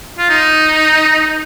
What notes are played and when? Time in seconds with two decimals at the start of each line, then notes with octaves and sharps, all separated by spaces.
0.18 F4
0.30 D#4